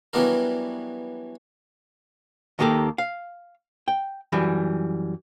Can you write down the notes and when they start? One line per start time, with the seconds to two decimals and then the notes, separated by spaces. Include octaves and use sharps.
0.13 E3 F#3 G3 B3 D4 A#4
2.59 D#2 D#3 A#3 G4 A4
2.98 F5
3.88 G5
4.32 F#2 E3 G3